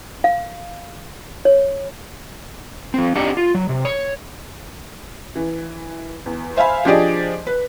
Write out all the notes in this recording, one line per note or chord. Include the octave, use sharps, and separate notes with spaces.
F5
C#5
F3 C4
C4 D4 D#4 G4 F#5
F4
F#3
C3
C#5
E3
E2
C5 E5 F5 G#5 B5
F3 D4 G4 G#4 D5 D#5
B4